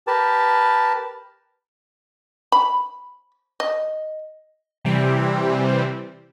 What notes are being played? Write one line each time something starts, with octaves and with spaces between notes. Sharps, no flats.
G4 A#4 B4 A5
B5
D#5
C3 E3 G3 C4